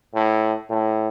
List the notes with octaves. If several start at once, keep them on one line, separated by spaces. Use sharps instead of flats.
A2
A2